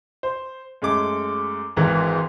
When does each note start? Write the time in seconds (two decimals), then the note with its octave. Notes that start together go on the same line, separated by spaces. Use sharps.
0.23 C5
0.82 F#2 G#3 A3 D6
1.77 G#1 G#2 E3 A#4